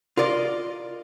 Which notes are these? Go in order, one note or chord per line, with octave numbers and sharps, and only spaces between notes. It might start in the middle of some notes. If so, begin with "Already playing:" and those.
F4 A#4 D5 D#5